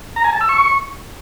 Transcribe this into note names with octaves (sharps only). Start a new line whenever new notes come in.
A#5
G#5
A5
E6
C#6